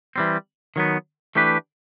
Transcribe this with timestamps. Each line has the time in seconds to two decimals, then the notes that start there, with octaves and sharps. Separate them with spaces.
0.16 E3 G3 C4
0.76 D#3 F#3 B3
1.35 E3 A3 D4 G4 B4